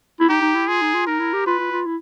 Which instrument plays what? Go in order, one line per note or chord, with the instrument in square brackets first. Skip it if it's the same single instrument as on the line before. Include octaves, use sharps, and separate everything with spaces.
[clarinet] E4
[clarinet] D#4 [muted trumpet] G4
[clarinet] D#4
E4
[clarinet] F4 [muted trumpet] G#4
[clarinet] D#4
F4
[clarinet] D#4 [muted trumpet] A#4
[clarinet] E4
G4
[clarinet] F4 [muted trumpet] B4
[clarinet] F4
F4
E4